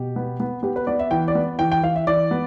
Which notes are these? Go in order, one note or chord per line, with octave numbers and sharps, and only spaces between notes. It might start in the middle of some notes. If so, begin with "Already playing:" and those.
Already playing: B2 G4
B3
B3
B3 G4
B4
B3 D5
E5
E3 G5
D5
B3
E3 G5
G5
E3 F5
E5
E3 D5
B3